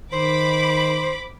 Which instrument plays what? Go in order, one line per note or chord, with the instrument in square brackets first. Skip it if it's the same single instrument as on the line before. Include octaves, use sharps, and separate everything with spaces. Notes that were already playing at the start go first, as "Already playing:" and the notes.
[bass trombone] D#3 [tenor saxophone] C5 [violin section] B5 D6